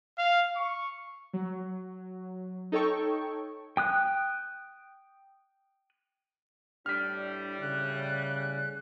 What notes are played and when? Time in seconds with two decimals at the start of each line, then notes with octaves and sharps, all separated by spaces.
0.18 F5
0.56 C#6
1.33 F#3
2.72 D#4 A4 C#5 G5 C#6
3.77 G5 D#6 F#6
6.86 A2 G3 D4 F6 B6
7.61 C#3 F#6